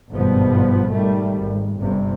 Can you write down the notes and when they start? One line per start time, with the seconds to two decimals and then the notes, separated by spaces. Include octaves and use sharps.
0.11 G#1 G2 B2 F3 G3 B3
0.92 G#2 D#3 G3 A3
1.38 G#1
1.80 G1 G2 C3